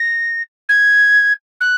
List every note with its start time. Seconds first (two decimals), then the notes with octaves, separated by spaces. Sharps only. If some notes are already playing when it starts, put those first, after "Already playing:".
Already playing: A#6
0.69 G#6
1.60 F#6